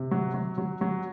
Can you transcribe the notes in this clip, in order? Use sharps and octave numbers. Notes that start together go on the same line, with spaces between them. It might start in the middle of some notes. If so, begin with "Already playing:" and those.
Already playing: C3
F#3
F#3
F#3
F#3